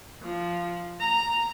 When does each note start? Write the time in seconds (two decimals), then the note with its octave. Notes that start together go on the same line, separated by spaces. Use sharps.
0.22 F3
1.00 A#5